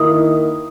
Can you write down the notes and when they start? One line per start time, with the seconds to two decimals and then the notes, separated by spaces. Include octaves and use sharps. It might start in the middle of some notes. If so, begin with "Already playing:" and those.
Already playing: D#3 A#3 E4 D#6